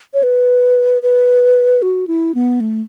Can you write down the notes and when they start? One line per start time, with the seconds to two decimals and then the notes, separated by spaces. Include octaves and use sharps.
0.14 C#5
0.23 B4
1.02 B4
1.82 F#4
2.07 E4
2.35 B3
2.60 A3